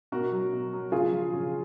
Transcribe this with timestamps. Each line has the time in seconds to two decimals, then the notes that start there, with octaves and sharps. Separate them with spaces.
0.12 B2 F#4 A#4
0.32 F#3
0.53 B2
0.73 F#3
0.92 C#3 F4 G#4
1.12 F3
1.33 C#3